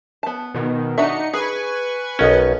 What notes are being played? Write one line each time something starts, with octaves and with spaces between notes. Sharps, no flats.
B3 A5
B2 D#3
D4 D#4 F#4 E5 C#7
G#4 B4 G#5 C#6
B1 C#4 A#4 D#5